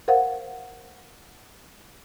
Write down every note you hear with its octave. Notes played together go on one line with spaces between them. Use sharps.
A#4 C5 F5 F#5